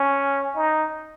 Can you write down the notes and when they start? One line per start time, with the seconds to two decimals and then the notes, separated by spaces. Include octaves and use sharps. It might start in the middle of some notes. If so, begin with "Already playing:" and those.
Already playing: C#4
0.56 D#4